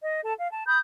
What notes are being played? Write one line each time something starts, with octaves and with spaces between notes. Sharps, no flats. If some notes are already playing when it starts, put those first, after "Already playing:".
D#5
A4 A5
F5
A5
B5 D#6 G6